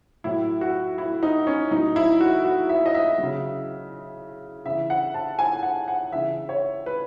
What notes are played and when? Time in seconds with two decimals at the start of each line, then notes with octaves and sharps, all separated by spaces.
0.24 A2 F#3 E4
0.61 F#4
0.98 E4
1.23 D#4
1.47 C#4
1.71 A2 F#3 D#4
1.96 E4
2.20 F#4
2.44 F#4
2.69 E5
2.86 D#5
2.95 E5
3.18 C#3 F#3
4.65 C#3 E3 E5
4.90 F#5
5.14 A5
5.39 G#5
5.63 F#5
5.88 F#5
6.12 C#3 E3 E5
6.49 C#5
6.86 B4